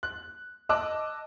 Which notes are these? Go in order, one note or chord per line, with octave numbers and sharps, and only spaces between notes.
F#6
D#5 A5 D6 E6 F#6